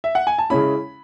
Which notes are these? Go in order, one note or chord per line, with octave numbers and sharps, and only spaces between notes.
E5
F#5
G#5
A5
C#3 G#3 C#4 E4 B5